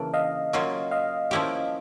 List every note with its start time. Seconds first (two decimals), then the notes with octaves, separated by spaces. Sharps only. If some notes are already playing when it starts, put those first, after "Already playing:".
Already playing: C#3 E3 A#3 D4
0.14 D#5 F5
0.53 F#3 A#3 C#4 F4
0.91 D#5 F5
1.31 F3 A#3 C#4 E4 G4